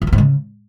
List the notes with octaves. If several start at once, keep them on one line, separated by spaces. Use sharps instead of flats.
F2
F#2
G#2
C#3